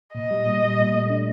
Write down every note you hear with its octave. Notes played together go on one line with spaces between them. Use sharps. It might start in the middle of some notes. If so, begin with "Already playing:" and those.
A#2 D#5
G3
A#2
G3
A#2
A3
D4